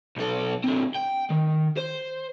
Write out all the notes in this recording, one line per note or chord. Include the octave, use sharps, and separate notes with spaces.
B1 A4
D3 C4
G5
D#3
C5